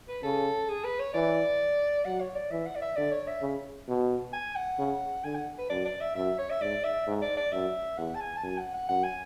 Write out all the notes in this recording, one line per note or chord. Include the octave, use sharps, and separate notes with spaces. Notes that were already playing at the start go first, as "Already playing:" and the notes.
B4
C#3 A4
G#4
B4
C#5
E3 D5
F#3 F#5
C#5
D5
E3 E5
F#5
D5
E5
D3 D5
C#5
E5
C#3
B2
G#5
F#5
C#3
D3 G#5
F#5
B4
F#2 D5
D5
E5
F#2 E5
C#5
E5
G#2 D5
E5
G#2
D5
D5
F#2 E5
E2 F#5
A5
G#5
A5
F#2 G#5
F#5
F#5
F#2 F#5
G#5